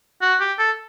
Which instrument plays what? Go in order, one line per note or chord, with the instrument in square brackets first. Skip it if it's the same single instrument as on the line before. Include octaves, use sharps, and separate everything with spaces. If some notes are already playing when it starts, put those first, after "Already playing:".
[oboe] F#4
G4
A4